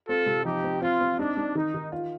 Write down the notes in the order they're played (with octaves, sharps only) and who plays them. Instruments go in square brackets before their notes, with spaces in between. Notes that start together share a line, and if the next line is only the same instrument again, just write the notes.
[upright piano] C4 [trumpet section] F4 A4
[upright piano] C3
[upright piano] F3 [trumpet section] D#4 G4
[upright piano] C4
[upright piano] C4 [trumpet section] F4
[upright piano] C4
[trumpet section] D4 [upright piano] D#4
[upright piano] D#4
[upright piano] D#3 [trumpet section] D#4
[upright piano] D#3
F4